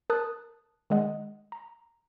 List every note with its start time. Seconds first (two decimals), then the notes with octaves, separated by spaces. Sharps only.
0.10 A#4 A5 D#6 F#6
0.90 D#3 G#3 D#5 F#5
1.52 A#5